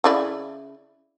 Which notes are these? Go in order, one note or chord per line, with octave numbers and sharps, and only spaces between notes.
C#3 E4 D5